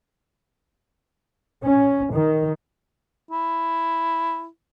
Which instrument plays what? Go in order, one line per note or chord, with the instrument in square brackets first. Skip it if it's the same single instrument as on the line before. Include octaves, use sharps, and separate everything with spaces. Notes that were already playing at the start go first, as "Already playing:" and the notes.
[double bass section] C#4
D#3
[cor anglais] E4